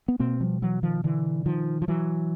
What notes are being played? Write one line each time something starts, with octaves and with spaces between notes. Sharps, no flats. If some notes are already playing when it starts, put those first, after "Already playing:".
B3
B2 A#3 C4
F3 G3
E3 F#3
D#3 F3
D3 E3
D#3 F3
F3
E3 F#3